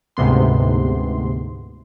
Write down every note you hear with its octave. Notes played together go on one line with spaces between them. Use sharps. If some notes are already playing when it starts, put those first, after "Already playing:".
D2 G#2 C3 B3 C6